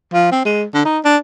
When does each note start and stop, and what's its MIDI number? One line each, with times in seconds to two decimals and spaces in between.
0.14 0.31 53
0.32 0.41 60
0.45 0.64 56
0.74 0.84 50
0.85 0.99 63
1.05 1.17 62